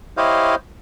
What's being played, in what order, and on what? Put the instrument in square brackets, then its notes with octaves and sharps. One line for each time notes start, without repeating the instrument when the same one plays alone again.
[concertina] E4 G4 C5 C#5 D#5 F5